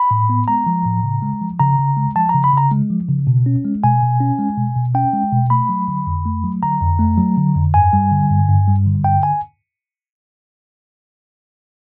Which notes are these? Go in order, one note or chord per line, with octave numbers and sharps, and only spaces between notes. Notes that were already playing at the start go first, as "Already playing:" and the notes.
Already playing: B5
A2
B3
G#3 A#5
F3
A2
C#3
G#3
F3
C#3 A#5
C#3
G#3
F3 A5
C#3 A#5
B5
C#3 A#5
G#3
F3
C#3
B2
C#4
G#3
B2 G#5
B2
C#4
G#3
B2
B2
C#4 G5
G#3
B2
A3 B5
F#3
D3
F2
A3
F#3
D3 A#5
F2
A3
F#3
D3
F2
G2 G#5
G3
D3
G2
G2
G3
D3
G2 G5
G#5